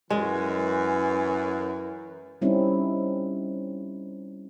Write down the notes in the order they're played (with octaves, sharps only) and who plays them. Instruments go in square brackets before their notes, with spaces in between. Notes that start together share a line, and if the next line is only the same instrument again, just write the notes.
[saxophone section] F#2 [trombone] E3 [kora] G#3
[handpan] G3 C4 C#4 D#4 E4